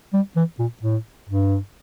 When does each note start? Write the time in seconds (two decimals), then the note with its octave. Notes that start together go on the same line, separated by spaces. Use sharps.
0.13 G3
0.36 E3
0.59 A#2
0.83 A2
1.29 G2